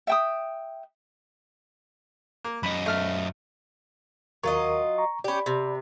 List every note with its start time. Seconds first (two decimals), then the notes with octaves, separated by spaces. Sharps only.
0.07 E5 G5 D#6
2.44 A#3
2.63 F#2 D#5 B5
2.86 A3 F6
4.43 D#2 F#3 F4 A#4 D#5 C#6
4.98 A#5 C#6
5.24 C#4 G4 D5 B5
5.46 C3